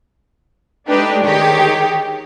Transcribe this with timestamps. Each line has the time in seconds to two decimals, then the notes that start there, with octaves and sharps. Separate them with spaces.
0.88 G#3 A3 D4 D#4 G4 B4
1.24 D#3 G4 G#4 C#5